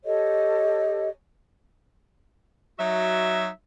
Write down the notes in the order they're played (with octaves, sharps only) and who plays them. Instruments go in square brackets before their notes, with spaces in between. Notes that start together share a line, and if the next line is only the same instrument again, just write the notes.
[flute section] G4 A4 C#5 D#5
[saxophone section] F#3 D#4 F#4 E5